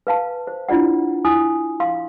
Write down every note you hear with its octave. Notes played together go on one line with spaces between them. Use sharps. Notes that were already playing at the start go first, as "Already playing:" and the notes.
B4 F5 A5
C5
D4 E4 F4 D5 F#5
E4 G#5 D#6
F5 C6